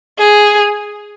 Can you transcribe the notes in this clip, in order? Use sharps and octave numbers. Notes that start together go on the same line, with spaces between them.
G#4